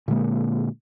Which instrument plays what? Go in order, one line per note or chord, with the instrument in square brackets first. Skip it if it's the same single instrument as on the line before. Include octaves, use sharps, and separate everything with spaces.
[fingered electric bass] A#2 D3 G#3 A#3